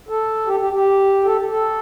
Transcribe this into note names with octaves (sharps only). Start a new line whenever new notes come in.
A4
G4
G4
G4
A4
A4